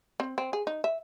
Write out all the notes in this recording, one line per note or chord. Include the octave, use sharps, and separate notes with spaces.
C4
C4
G#4
D#4
E5